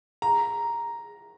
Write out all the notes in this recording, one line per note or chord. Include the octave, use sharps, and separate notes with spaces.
A#5